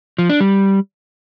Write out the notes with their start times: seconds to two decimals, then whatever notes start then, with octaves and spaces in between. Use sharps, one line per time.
0.18 F3
0.29 D4
0.40 G3